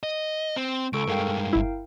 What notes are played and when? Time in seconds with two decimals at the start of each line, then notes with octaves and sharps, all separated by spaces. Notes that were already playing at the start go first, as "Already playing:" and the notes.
0.03 D#5
0.56 C4
0.93 C#2 A4 C#6 D7
1.08 G2 G#3 A#4 F5 G5
1.53 G1 E4